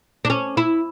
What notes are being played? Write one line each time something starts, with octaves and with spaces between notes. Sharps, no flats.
D4
C#4
E4